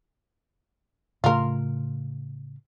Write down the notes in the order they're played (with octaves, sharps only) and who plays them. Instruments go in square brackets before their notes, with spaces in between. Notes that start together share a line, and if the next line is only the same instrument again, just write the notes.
[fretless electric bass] A2 C#3 A3 [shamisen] F4 A#4